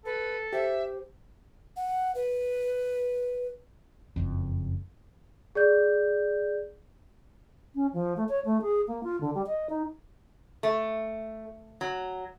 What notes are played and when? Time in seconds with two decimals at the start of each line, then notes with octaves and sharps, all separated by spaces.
0.05 A4 B4
0.53 G4 C5 E5
1.76 F#5
2.15 B4
4.16 F#1 F2
5.55 G#4 D5 G6
7.75 C#4
7.94 F3
8.17 A3
8.29 C#5
8.45 A3
8.62 G#4
8.88 A#3
9.04 F4
9.21 D3
9.35 G3
9.47 D#5
9.70 D#4
10.63 A3
11.81 F#3